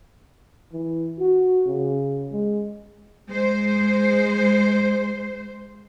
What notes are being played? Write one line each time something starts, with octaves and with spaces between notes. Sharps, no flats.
E3
F#4
C#3
G#3
G#3 C5